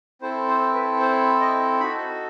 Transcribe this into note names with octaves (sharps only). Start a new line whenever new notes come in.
C4 E4 A4 C5
C5
B4
C5
D#5
D#4 F#4 A4 B5